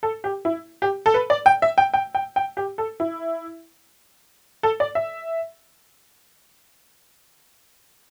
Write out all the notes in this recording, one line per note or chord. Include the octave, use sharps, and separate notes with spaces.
A4
G4
E4
G4
A4
B4
D5
G5
E5
G5
G5
G5
G5
G4
A4
E4
A4
D5
E5